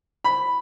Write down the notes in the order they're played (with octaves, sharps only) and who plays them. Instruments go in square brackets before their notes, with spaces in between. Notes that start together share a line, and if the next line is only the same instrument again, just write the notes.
[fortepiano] B5